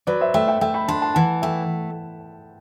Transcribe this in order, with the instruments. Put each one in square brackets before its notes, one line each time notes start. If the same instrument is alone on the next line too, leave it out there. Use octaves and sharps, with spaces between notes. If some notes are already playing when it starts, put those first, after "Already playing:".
[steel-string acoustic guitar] F#3 [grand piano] B4 D5
[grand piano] C5 E5
[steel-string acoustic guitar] A3 [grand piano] E5 G5
[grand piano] E5 G5
[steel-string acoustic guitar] A3 [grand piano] E5 G5
[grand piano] G5 B5
[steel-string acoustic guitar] D4 [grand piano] A5 C6
[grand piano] A5 C6
[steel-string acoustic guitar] E3 [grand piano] F#5 A5
[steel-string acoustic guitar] A3 [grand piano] E5 G5